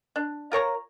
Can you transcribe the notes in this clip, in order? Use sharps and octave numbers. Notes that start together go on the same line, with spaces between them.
D4
F4 A#4 C#5 A#5